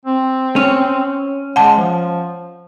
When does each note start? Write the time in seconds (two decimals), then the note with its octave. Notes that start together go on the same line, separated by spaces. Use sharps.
0.05 C4
0.56 C#4
1.56 G#3 F#5 A5
1.77 F3